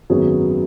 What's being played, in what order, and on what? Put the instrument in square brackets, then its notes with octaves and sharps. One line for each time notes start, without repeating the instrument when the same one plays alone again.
[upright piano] G#1 F#2 F#3 B3 G#4